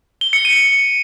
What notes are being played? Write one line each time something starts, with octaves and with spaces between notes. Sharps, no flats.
G7
C#7
D#7